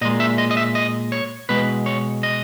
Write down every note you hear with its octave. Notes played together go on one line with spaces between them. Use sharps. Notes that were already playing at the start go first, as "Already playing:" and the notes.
A#2 G#3 D#5
E5
D#5
D#5
E5
D#5
C#5
B2 G#3 B4
C#5
D#5